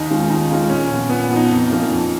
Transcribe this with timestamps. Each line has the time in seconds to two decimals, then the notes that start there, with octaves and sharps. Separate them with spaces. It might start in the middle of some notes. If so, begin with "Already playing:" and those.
Already playing: D#2 D#4
0.10 D#3 G#3 C#4 F4
0.30 D#2 D#4
0.50 D#3 G#3 C#4 F4
0.70 A#2 C#4
0.90 F3 B3
1.10 A#2 B3
1.29 F3 B3
1.36 D#4
1.50 F2
1.70 F3 A#3 C#4
1.89 F2